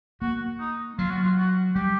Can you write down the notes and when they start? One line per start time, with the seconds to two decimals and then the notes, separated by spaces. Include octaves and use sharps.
0.21 A#3 F#4
0.60 D#4
0.99 F#3 F4
1.10 F#4
1.23 F4
1.37 F#4
1.75 G3 G4